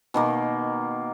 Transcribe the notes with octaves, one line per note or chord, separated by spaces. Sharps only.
B2 D#3 A#3